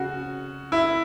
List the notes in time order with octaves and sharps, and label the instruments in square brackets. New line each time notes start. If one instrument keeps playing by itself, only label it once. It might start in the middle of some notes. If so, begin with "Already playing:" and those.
Already playing: [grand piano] C#3 F#4
E4